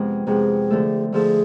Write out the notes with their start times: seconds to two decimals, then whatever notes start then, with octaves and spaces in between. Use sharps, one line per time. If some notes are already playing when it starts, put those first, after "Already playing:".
Already playing: F2 C3 G#3 B3
0.27 F2 C3 G#3 B3 G#4
0.70 D3 F3 A3 E4 A4
1.12 D3 F3 A3 E4 G#4 A4